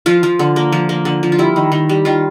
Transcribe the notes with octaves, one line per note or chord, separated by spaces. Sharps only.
F3 F4
F3
D3
A#3
F3
A#3
D3
F3
F4
G3 E4
D#3
D#3
G3
D#3 F4